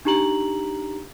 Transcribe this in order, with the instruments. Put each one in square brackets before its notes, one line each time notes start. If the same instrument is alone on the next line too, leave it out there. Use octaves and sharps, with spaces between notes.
[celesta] D4 D#4 G4 A#5 F#7